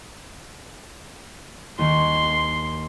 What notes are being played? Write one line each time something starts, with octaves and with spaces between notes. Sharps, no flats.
D#2 D#3 C6 C#6